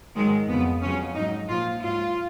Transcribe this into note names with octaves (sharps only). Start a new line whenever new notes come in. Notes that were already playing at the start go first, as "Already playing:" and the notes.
G#2 D#3 F#3 G#3
F2 C#3 F#3 B3
F2 C#3 F#3 C#4
G#2 F#3 D#4
A#2 F3 F4
G#2 F#3 F4